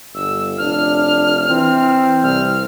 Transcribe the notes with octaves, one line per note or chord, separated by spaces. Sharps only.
G1 E6
F1 D4 F6
E3 C4
C2 F6